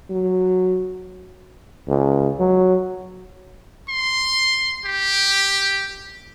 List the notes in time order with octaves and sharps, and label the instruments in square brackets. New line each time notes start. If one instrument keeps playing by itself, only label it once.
[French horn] F#3
[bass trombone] C#2
F#3
[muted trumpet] C6
G4